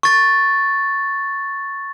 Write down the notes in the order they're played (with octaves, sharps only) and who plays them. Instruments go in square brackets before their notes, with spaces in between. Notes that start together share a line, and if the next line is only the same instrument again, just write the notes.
[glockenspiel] C#6 A6